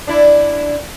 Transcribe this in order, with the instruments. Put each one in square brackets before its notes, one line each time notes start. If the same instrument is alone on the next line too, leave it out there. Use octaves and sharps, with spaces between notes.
[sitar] D4 E4